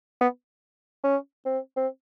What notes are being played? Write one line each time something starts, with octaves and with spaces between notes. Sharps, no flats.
B3
C#4
C4
C4